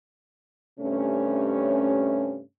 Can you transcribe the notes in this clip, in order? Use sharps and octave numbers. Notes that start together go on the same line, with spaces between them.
G2 C3 A3 C#4